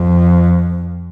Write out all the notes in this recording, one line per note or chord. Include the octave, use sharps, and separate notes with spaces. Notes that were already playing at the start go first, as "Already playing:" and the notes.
Already playing: F2